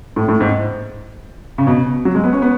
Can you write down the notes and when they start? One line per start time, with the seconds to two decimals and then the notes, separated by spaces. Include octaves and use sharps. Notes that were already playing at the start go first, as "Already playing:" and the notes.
0.16 A2
0.29 A2
0.41 G#2
1.58 C#3
1.67 B2
2.05 F#3
2.15 G#3
2.24 B3
2.33 C#4
2.42 B3